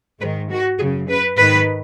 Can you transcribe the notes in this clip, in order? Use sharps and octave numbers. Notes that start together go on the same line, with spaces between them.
G#2 D#3 B4
F#4
F#2 C#3 G#4
B4
G#2 D#3 B4